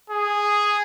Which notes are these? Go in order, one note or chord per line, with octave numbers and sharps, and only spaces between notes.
G#4